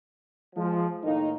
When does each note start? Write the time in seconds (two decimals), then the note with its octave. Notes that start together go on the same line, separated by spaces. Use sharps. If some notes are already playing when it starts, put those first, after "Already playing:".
0.56 F3 G#3
1.04 A2 D#3 A#3 D#4